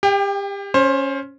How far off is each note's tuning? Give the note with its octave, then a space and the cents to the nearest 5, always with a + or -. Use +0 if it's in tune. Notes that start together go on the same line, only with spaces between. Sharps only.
G4 +30 G5 +0
C#4 +0 C5 +25